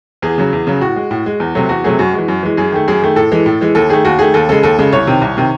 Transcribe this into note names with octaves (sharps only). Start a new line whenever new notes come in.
E2 G#4
C#3 F#3
E2
C#3 F#3
A2 F#4
G#3
A2
G#3
E2
C3 F#3 A3
E2 F#4
C3 F#3 A3 G#4
F#2 F#4
E3 G#3
F#2
E3 G#3
F#2 G#4
D#3 A3
F#2 G#4
D#3 A3
A2 A4
E3 G#3
A2
E3 G#3
D#2 A4
D#3 A3 G#4
D#2 F#4
D#3 A3 G#4
D#2 A4
C#3 G#3 A4
D#2 A4
C#3 G#3
C2 C#5
C3 D#3
C2
C3 D#3